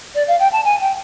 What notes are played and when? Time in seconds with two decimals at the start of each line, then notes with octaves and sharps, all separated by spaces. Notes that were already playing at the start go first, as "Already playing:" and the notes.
0.15 D5
0.27 F5
0.39 G5
0.52 A5
0.64 G#5
0.81 G5